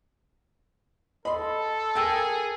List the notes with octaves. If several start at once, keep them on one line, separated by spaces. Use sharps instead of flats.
A4 D#5 B5 C6
G#4 A#4 G5 G#5 E6